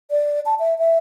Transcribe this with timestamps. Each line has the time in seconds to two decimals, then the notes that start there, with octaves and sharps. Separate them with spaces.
0.11 D5
0.46 A5
0.59 E5
0.78 E5